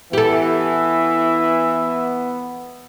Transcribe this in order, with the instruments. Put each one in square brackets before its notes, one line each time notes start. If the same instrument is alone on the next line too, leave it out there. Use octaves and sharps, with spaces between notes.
[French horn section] E3 [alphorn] B3 [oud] G4 A4 [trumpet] E5